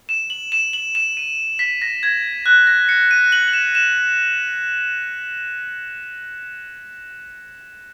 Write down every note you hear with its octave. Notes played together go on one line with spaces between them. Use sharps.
E7
F#7
E7
F#7
E7
D#7
B6
A#6
G#6
F#6
A#6
C#7
D#7
F#7
F#7
E7
E7